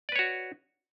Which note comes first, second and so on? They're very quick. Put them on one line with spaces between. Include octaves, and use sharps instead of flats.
D5 B4 C#5 F#4